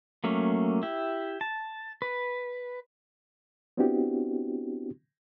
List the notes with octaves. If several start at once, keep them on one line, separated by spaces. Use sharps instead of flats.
F#3 A3 A#3 C#4
E4 G4
A5
B4
B3 C4 D4 E4 F#4 G4